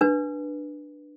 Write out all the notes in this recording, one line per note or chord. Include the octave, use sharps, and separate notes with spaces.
D4 B4